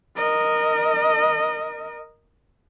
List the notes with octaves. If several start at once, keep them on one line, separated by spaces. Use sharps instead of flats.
A#4 D#5